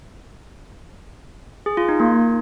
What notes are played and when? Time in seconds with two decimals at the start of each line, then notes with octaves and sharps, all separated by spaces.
1.66 G#4
1.77 F4
1.89 D#4
2.00 A#3